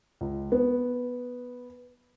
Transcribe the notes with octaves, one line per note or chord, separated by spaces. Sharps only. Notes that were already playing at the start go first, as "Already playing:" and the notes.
C#2
B3